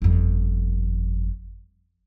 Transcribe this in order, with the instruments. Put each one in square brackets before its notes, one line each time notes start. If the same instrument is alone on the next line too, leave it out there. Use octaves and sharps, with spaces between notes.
[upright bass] G1 F2